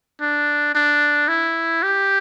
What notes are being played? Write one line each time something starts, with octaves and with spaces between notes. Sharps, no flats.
D4
D4
E4
G4